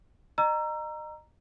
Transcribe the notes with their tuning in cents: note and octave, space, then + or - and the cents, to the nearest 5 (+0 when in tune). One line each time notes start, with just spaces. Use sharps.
D#5 -30 A#5 +0 E6 +30